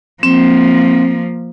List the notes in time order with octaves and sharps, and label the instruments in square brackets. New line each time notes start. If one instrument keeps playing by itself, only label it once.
[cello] F3 A#3 [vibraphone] C4